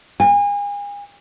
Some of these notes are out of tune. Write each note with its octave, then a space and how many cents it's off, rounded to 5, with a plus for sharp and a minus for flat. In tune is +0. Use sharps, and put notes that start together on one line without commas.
G#5 -35